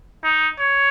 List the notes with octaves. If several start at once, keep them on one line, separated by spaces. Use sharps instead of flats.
D#4
C#5